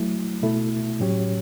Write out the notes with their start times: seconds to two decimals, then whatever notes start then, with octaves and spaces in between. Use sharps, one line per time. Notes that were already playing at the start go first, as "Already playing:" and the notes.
Already playing: F#3 A3 E4
0.42 B2 A3 E4 A4
1.00 A2 F#3 C#4 G4 C#5